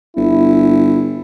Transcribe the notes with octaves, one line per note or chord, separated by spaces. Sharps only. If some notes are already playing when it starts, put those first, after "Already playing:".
G1 E4